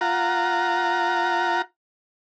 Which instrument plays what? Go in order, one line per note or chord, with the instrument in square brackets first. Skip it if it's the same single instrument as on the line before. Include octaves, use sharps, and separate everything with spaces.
[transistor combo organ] F4 F#5 A#5